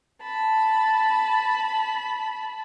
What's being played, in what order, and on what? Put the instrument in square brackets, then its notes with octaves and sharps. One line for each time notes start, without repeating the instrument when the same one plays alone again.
[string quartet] A5 B5